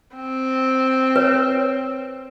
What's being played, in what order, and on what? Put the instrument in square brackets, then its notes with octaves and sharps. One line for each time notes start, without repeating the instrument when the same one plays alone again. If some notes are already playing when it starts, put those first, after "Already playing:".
[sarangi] C4
[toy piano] B4 C#5